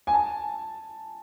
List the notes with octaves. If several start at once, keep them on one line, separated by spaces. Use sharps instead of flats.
G#5
A5